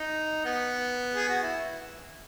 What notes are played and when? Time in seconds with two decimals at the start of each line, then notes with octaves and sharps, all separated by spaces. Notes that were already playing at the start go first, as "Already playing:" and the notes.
Already playing: D#4
0.45 B3
1.15 G#4
1.29 F#4
1.43 E4